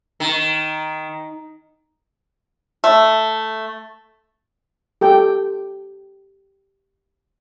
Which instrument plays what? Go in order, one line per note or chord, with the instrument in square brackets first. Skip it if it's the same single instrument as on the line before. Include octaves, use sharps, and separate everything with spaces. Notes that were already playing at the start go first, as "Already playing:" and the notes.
[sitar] D#3
[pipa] A3
[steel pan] G4 A4 G5